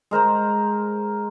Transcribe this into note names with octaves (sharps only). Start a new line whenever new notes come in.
G#3 A#4 C5 A#5